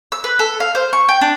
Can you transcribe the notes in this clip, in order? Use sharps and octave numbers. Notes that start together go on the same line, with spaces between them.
E6
B4
A4
F5
C5
C#6
G5
D4